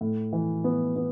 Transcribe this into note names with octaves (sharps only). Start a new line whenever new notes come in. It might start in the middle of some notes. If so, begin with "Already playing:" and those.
A2
E3
B3
B3